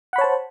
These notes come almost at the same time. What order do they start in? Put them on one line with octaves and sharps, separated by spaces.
F#5 B5 C#5 A5 C5